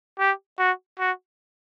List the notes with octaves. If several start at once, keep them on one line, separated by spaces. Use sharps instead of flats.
G4
F#4
F#4